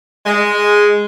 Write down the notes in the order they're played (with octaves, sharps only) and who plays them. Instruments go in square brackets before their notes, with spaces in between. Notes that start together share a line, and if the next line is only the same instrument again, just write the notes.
[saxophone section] G#3